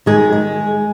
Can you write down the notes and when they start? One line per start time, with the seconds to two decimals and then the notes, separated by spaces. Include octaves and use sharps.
0.06 D#3 G#3 G#4
0.32 G#3